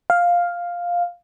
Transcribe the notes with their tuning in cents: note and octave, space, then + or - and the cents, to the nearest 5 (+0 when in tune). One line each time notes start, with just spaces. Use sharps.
F5 +5